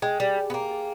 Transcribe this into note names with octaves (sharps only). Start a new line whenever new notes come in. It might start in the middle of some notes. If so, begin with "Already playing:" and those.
G#3 G5
G3 G#4
G#4
B3
A#3 G5
G#4